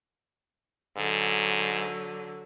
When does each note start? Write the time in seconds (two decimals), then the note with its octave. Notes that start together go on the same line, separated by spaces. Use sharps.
0.97 G#2 D3 F#3